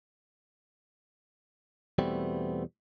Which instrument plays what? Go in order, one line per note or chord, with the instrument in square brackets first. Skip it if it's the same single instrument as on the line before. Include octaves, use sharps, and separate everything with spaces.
[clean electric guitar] E2 B2 G3 A3 B3 C4